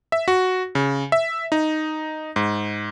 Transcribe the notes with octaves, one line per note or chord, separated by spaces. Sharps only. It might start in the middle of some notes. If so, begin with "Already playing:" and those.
E5
F#4
C#3
E5
D#4
G#2